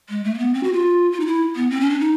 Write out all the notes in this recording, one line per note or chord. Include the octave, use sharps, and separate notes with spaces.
G#3
A3
A#3
B3
C4
F#4
F4
F4
D#4
E4
B3
C4
C#4
D4
D#4